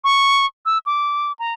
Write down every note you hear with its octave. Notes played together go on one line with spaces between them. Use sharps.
C#6
E6
D6
A#5